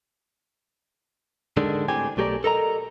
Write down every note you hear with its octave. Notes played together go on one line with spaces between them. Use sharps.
G#2 D3 D#3 G#3 D4
A2 C4 G4 G#5
B1 A3 G4 G#4 A#4 D5
A4 A#4 D#5 A#5